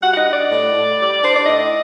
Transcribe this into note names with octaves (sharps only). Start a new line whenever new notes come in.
G3 F#5
F#5
D#5
D4
D5
A2
A2
G3
D4 C5
D5
A2 D#5